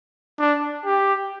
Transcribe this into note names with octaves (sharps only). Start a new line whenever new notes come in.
D4
G4